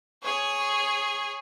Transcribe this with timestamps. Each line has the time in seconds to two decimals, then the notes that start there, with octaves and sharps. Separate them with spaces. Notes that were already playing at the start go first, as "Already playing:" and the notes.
0.23 G#4 C#5